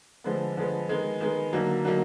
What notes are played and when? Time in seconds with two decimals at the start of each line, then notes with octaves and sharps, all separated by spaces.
0.24 D3 F3 G#3 B3
0.57 D3 F3 G#3 B3
0.89 D#3 G#3 B3
1.20 D#3 G#3 B3
1.53 D3 F#3 A#3 D#4
1.85 D3 F#3 A#3 D#4